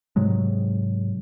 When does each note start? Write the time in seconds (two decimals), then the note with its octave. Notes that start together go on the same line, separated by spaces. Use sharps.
0.16 G#2 C3 F#3 G#3